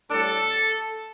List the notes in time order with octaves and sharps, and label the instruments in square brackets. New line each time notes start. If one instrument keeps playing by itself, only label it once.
[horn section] A2 G3 D4 A4